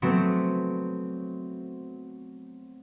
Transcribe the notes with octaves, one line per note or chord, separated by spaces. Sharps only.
F#3 A3 B3 C4